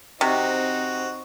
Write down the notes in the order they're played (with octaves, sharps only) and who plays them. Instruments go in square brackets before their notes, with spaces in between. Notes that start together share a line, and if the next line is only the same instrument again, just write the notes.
[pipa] C3 [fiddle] C4 D#4 [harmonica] F#4